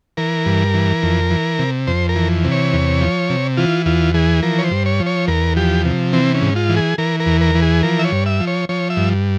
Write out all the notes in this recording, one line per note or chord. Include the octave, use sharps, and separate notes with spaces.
E3 A#4
G2
E3
F2
E3
C3
F2 C5
A#4
E3
C3
C#5
E2
F3
C3
E3 F4
E2 F4
E3 G#4
F3 A#4
C#5
C5
G2
C#5
F3
C#5
E2 A#4
F3 G4
C3
E3 C4
C#4
G#2
F4
E3
G#4
E3 A#4
A#4
E2
A#4
E3
G#4
F3 A#4
E5
C#5
G2
E5
F3
C#5
F3 C#5
E5
G2